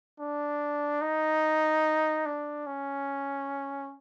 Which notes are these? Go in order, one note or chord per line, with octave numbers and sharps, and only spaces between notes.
D4
D#4
D4
C#4